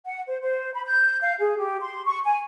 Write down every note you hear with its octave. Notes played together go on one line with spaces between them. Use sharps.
F#5
C5
C5
B5
G6
F5
G#4
G4
C6
C#6
G#5